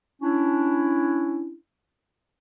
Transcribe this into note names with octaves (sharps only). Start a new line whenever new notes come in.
C#4 D4 E4